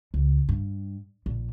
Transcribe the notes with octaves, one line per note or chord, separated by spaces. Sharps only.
C#2
G2
A#1